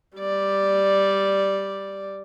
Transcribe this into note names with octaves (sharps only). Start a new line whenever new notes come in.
G3 D5